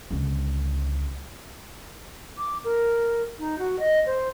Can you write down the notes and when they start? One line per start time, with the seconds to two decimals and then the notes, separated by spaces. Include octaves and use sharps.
0.11 C#2 D3
2.37 D6
2.64 A#4
3.38 D#4
3.58 F#4
3.78 D#5
4.05 C5